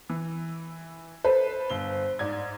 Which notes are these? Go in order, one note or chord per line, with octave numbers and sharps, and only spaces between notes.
E3
A4 B4 C5
G1 G7
G#2 D5 G#6